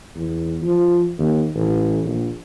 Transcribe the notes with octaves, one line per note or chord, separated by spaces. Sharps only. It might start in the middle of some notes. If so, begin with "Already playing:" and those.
E2
F3
D#2
A1
A#1